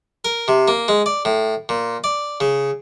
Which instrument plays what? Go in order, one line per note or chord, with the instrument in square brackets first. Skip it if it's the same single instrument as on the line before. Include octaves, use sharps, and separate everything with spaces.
[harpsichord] A#4
C3
A#3
G#3
D5
A2
A#2
D5
C#3